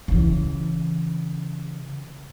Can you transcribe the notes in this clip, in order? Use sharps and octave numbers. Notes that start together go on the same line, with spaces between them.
C#3 E3